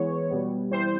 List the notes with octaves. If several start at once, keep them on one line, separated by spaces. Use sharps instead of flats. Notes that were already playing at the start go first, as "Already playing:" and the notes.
Already playing: E3 G#3 B3 C#5
B2 G3 B3
E3 G3 C4 C5